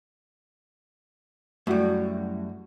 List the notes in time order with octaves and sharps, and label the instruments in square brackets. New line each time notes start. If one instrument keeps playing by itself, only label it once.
[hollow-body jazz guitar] F#2 G3 [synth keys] A3 E4 F#4